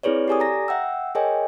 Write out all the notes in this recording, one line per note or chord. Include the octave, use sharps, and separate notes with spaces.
C4 E4 G#4 B4 C#5 D5
G4 A4 D5 G#5 D6 D#6
A#5 A#6
E5 F#5 G5 E6
G#4 A#4 C#5 D#5 G5 G#5